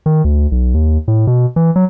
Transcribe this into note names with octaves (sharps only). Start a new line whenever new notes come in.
D#3
D2
B1
D#2
A2
B2
E3
F#3